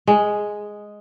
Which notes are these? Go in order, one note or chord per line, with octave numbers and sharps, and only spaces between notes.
G#3